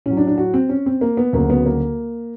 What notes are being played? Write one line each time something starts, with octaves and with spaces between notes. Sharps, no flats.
A2 F#3 C#4
D4
D4
F#4
C4
C#4
C4
A#3
B3
D2 C#3 F#3 A#3
B3
A#3